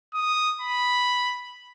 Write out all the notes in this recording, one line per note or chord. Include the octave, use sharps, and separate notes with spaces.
D#6
B5